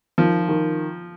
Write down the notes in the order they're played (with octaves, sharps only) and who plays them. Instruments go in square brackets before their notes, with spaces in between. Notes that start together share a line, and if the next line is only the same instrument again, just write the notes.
[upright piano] D#3 [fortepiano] F3
[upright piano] D#3